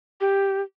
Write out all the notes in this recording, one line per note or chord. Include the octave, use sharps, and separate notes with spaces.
G4